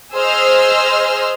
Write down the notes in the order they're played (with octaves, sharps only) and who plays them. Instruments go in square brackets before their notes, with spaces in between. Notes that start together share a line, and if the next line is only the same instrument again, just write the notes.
[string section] G#4 C5 D#5 E6 F6